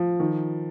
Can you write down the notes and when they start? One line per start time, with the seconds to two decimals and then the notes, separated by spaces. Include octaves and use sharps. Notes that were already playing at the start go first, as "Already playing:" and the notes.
Already playing: F3
0.20 D#3